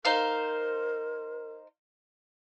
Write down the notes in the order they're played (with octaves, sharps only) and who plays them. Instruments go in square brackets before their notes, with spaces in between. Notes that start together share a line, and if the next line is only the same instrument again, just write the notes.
[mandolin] D#4 C5 F5 [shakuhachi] A#4